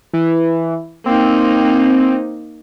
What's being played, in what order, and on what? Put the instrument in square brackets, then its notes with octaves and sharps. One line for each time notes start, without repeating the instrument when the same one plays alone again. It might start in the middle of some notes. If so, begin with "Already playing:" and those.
[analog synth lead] E3
[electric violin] A#3 D#4 [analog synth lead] C4